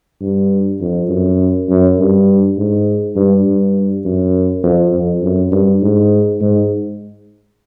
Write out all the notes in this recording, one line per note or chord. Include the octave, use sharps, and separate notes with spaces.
G2
F2
F#2
F#2
G2
G#2
G2
G2
F#2
F2
F2
F#2
G2
G#2
G#2